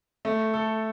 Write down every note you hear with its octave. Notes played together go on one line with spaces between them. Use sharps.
A3
A4